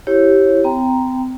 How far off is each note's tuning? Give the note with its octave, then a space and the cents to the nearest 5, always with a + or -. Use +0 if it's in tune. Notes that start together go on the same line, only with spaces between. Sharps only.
E4 +0 G4 -10 C#5 -25
C4 -35 G5 +0 A#5 +0